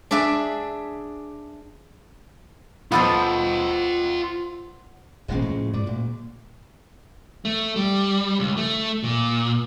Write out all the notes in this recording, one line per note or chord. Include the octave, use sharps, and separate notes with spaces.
D4 G#4 D5 E5
B3 F4 A4 C5 D#5
D#1 G#1 C#3 F3 G#3 A#3
A2
G#2 D5
D2 A#2
A3
G3
C#2
A3
A#2